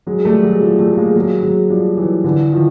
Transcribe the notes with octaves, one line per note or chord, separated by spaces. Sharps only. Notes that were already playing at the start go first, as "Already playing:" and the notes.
F#3 G#3
G3 A3
F#3 G#3
F3 G3
G3 A3
A3
G#3 A#3
F#3 G#3
F#3 G#3
F3 G3
E3 F#3
D3 E3
D#3 F3